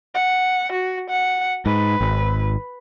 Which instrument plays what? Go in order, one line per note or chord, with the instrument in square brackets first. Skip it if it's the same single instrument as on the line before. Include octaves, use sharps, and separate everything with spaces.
[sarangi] F#5
F#4
F#5
[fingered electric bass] G#2 [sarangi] B4
[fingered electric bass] G#1